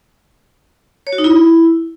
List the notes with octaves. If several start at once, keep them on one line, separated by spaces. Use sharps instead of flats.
C#5
F#4
D#4
E4